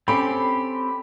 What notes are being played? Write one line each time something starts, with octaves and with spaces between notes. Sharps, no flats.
C4 C#4 G4 A4 B5